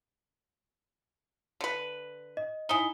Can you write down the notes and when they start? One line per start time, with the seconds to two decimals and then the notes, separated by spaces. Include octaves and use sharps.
1.61 D3 B4
2.37 D#5
2.69 D#4 E4 G#5 D#6 G7